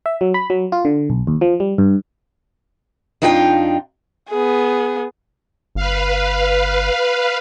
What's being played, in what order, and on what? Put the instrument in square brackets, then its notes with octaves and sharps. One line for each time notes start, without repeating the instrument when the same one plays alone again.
[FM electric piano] E5
F#3
B5
F#3
F4
D3
B1
D#2
F3
G3
G2
[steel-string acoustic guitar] F2 D4 D#4 F4 A4 G5
[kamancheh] B3 G#4
[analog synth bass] G1 [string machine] B4 F5